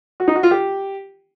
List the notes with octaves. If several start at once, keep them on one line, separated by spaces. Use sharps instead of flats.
F#4
D#4
F#4
F4
G4